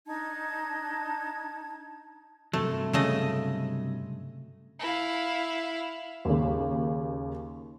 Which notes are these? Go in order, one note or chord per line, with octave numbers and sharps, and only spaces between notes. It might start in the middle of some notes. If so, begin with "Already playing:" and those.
D4 D#4 A5 G#6
G2 C3 F#3 A3
C#3 A3 D#5
E4 F5
D#2 C#3